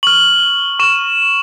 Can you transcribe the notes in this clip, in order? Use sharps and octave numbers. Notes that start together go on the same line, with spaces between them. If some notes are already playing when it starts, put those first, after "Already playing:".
C#6 F6 F#7
C#6 F6 E7